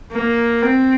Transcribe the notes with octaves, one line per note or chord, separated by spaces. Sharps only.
A#3
C4